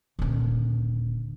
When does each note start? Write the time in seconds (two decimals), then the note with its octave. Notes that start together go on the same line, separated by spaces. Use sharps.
0.19 D#1 D3